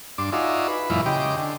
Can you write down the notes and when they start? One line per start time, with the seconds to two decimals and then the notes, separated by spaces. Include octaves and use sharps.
0.18 G2 D4 C6 D6
0.32 D#4 F4 F#4 G#4 D5 E5
0.68 B4
0.90 F#2 A#2 E3 G#3 E4 F4
1.06 C#3 G4 D#5 G5 C6 D6
1.37 D3